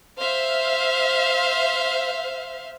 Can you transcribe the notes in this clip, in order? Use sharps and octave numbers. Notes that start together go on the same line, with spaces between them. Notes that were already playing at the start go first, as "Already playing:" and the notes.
C5 E5 F5